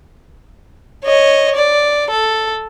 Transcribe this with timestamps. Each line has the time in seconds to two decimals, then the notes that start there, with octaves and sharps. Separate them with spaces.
1.04 C#5 D#5
1.56 D5
2.11 A4